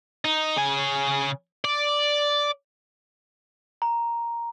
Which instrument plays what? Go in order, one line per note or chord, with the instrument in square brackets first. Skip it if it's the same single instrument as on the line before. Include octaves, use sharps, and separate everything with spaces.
[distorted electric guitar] D#4
C#3 G#5
D5
[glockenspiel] A#5